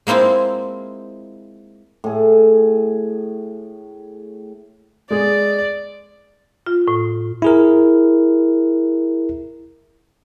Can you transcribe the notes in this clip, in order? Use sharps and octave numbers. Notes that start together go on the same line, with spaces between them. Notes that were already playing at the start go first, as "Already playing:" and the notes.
G#3 A#3 C4 E4 F4
A2 G#4
G#3 G#4 D5
F4
A2
E4 G#4 A#4